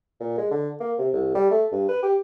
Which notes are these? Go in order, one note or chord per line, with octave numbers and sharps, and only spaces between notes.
A#2
G#3
D3
A#3
C3
C2
G3
A3
G2
B4
G4